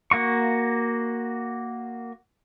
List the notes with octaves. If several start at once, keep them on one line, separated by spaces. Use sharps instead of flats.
A#3 F#4 C#6